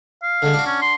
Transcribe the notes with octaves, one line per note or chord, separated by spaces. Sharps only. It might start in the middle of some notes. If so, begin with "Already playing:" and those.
F5
D3 G#3
D4 F#4
C#4
C6